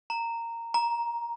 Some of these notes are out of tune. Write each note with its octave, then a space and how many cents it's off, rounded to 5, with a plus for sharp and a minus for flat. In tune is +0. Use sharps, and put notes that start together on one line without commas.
A#5 -15
A#5 +10